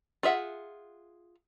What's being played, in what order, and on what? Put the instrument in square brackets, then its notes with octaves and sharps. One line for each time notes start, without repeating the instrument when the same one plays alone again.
[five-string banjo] F4 G#4 E5 F#5